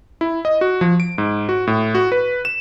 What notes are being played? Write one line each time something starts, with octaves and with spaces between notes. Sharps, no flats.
E4
D#5
F#4
F3
D7
G#2
F#4
A2
F#4
B4
E7